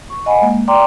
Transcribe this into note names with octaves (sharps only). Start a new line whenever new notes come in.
C#6
D#5 F#5 G#5 B5
G#3 A#3
D5 G5 A#5 C6 D6